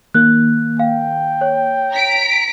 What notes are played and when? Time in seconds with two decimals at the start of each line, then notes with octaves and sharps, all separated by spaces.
0.14 D#3 A#3 F#6
0.79 F5 G5
1.41 C#5
1.91 A#5 B6 D7